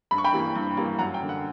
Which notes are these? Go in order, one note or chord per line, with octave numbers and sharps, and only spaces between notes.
G2 B5
C#6
G5 B5
E3 G3 A#3
G2
E3 G3 A#3
F#2 F#5 A#5
G5
D3 A#3
F#5